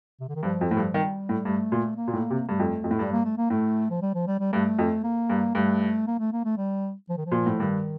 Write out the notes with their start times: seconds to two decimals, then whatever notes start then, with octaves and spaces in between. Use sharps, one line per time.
0.20 C3
0.29 D3
0.35 D#3
0.43 G2 F3
0.61 F2
0.71 A2
0.77 G2
0.94 D#3 G3
1.29 A2
1.45 G2 A3
1.72 A#2
1.97 A#3
2.08 A#2
2.13 A2
2.30 C3
2.48 G2 A3
2.59 F2
2.84 F2
2.91 A2
2.99 G2 G3
3.12 A#3
3.25 A3
3.37 A#3
3.50 A2 A3
3.90 F3
4.02 G3
4.14 F3
4.27 G3
4.39 G3
4.53 G2 A3
4.79 F2
5.04 A#3
5.30 G2
5.55 G2 A3
6.07 A#3
6.19 A3
6.32 A#3
6.44 A3
6.57 G3
7.09 F3
7.17 D#3
7.26 F3
7.32 A#2
7.46 A2
7.60 G2 D#3